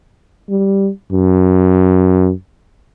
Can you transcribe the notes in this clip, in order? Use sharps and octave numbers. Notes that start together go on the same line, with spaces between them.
G3
F#2